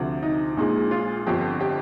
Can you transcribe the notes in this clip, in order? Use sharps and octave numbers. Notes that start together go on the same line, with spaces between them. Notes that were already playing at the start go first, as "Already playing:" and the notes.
Already playing: D2 C3 F3
D#4
A#1 A#2 G#3 D#4
F4
G1 F2 D3 G4
G4